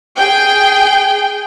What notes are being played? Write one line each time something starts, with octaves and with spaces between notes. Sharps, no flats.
G#4 G5